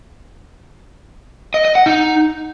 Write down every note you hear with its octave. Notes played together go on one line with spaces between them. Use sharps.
D#5
D#5
F#5
D#4